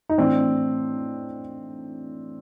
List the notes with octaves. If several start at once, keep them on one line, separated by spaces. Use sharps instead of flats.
D#4
A2 E3 C4 D4